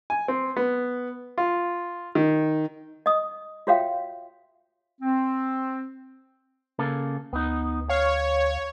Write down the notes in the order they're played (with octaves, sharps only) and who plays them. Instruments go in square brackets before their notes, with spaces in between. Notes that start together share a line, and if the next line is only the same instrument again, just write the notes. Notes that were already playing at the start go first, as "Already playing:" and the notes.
[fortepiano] G#5
C4
B3
F4
D#3
[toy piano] D#5 D#6
F4 F#4 C#5 E5 F5 G5
[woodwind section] C4
[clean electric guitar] C#3 A#3 A4
[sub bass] D2 [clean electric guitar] B3 D#4
[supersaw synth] C#5 [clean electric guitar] F5